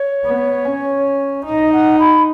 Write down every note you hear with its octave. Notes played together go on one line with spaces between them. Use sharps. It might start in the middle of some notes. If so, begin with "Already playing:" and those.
Already playing: C#5
B3
C#4
D#4 D#5
F#5
B5